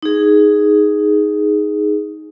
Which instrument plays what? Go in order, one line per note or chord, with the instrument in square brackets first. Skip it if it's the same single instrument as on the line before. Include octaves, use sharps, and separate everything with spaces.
[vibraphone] D#4 G#4